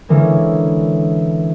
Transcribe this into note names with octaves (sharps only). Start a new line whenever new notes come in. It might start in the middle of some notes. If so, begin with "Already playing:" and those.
D3 E3 G#3 A#3 C#4